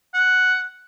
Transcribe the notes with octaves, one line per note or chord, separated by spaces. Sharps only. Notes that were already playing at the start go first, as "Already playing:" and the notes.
F#5